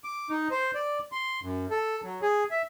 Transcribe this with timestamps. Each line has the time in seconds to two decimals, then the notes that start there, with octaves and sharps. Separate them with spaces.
0.04 D6
0.30 D#4
0.51 C5
0.75 D5
1.12 C6
1.42 F#2
1.70 A4
2.03 F#3
2.22 G#4
2.51 E5